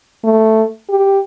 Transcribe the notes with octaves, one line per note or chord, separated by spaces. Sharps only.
A3
G4